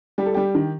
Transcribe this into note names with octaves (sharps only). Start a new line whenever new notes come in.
G3 G4
A4
G3 G4
D#3